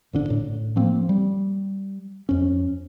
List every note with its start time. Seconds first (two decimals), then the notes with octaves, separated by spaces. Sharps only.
0.13 G#1 D3 D4
0.30 A2
0.76 F3 A3 A#3 C4
1.09 G3
2.29 F2 C#4